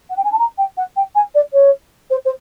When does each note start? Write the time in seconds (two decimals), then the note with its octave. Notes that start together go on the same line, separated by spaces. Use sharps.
0.10 F#5
0.17 G5
0.24 G#5
0.32 A5
0.39 A#5
0.58 G5
0.77 F#5
0.96 G5
1.15 G#5
1.35 D5
1.53 C#5
2.10 C5
2.25 C5